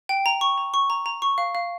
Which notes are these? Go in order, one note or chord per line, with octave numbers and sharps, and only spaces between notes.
G5
A#5
C#6
A#5
C#6
A#5
A#5
C#6
F5
F5